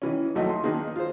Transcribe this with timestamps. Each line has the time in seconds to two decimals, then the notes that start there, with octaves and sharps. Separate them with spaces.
0.02 D#3 E3 C#4
0.35 A#1 D#2 F#3 A3 D#4 D#5
0.50 C6
0.64 D#3 A#3 D4 D#4 G#4 B4
0.96 F4 G#4 C5